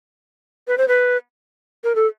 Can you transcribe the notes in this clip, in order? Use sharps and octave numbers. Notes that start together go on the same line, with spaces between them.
B4
C5
B4
A#4
A4